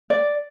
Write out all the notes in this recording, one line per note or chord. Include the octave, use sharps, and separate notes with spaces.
D5